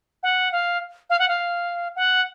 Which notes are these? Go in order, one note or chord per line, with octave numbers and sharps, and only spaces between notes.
F#5
F5
F5
F#5
F5
F#5